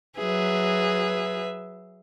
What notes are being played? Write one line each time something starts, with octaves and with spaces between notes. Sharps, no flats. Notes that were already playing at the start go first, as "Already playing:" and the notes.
F#3 G#4 B4 E5